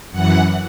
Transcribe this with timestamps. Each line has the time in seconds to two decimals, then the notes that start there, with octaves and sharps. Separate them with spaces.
0.11 F#2 E3 F#5